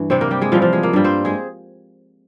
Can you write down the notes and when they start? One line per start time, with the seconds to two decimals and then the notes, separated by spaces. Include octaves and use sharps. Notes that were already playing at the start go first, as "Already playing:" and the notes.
Already playing: G2 E3
0.10 C3 G3 C4 C5
0.21 A#3 A#4
0.31 G3 G4
0.41 G#3 G#4
0.52 C3 E3 F3 G3 F4
0.62 F3 F4
0.73 G#3 G#4
0.83 A#3 A#4
0.93 G2 G3
1.04 C4 C5
1.25 G#3 G#4